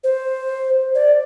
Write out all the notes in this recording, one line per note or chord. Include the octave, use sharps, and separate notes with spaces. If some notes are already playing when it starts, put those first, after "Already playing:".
C5
D5